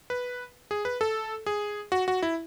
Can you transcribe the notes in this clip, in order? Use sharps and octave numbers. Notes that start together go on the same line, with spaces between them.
B4
G#4
B4
A4
G#4
F#4
F#4
E4